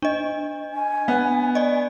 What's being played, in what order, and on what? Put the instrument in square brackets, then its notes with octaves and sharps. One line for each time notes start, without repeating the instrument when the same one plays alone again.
[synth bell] D4 D#5
[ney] G#5
[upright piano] B3
[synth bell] D5 D#5